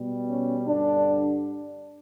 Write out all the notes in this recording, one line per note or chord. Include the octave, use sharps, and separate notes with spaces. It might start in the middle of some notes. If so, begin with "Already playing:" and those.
Already playing: B2 G3
C#4
G2 D3 G3 D4